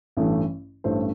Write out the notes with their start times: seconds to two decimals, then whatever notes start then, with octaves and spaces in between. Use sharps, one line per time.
0.17 A1 G2 E3 A3
0.84 A1 G2 E3 A3 C5